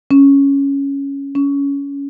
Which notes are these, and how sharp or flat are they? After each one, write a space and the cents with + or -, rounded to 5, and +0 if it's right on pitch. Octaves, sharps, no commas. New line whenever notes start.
C#4 +0
C#4 +20